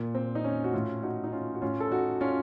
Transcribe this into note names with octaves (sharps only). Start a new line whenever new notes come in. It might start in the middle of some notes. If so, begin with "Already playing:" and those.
Already playing: A#2
C4
D#4
C#4
F#4
A2 C#4 F4
D#4 F#4
D#4
C#4 F4
F#4
A2 C#4 F4
A4
D#4 F#4
C#4 F4